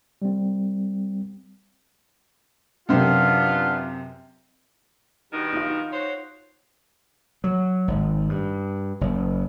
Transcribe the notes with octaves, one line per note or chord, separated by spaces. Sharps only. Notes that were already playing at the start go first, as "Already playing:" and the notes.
G3 C4
F#2 C3 B3 C4 D4 F4
G2 B2 D#3
D#4 F4
F#4 C5 C#5
F#3
G#1
G2
F#1